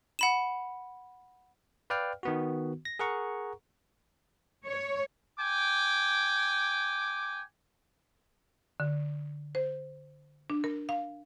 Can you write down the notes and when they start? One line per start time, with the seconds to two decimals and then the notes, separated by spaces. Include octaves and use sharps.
0.19 F#5 B5 E7
1.90 B4 D5 F5 G5 F6
2.23 D#3 B3 F#4
2.85 A#6
2.99 G#4 A#4 F#5 A#5 C#6
4.66 C#5
5.39 G5 G#5 D6
8.80 D3
9.55 C5
10.50 D4
10.64 A#4
10.89 F5